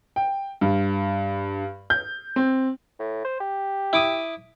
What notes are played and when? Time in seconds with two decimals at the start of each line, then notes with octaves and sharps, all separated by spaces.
0.16 G5
0.61 G2
1.90 G6
2.36 C4
2.99 A2
3.25 C5
3.40 G4
3.93 E4 D6 D#6